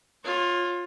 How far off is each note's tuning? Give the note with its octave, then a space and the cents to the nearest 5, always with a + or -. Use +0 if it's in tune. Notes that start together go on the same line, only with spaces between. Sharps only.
F4 +15 C#5 -20